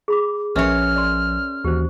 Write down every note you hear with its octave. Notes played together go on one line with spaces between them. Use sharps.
G#4 B5 D6
A#1 F3 C#4 A#4 B4 C#5 E5 F6
D5 C6
D#2 E3 F#4 G4 C5